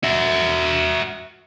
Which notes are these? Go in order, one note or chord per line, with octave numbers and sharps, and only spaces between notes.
F#4 E5